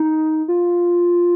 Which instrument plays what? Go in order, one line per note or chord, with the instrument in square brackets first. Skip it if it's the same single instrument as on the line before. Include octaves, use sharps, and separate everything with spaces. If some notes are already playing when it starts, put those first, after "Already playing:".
Already playing: [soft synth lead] D#4
F4